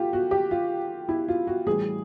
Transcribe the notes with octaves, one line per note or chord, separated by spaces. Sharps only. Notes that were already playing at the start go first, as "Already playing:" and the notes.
Already playing: A3 F4 G4
F#4
G4
F4
E4
F4
F#4
A2 E3 G3 G#4